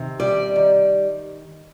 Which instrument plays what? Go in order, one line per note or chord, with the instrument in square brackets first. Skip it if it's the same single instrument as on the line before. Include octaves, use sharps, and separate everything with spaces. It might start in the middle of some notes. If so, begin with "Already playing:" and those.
Already playing: [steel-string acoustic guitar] C3 D#3
G3 D5
D#3